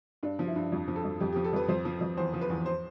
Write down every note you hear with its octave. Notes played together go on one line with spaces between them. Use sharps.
G2 D4
F3
E4
G2
F2
F3
A4
F2
F2 G4
F3 G4
A4
F2 B4
F2 C5
F3
F2
E2 C5
F3
B4
E2
C5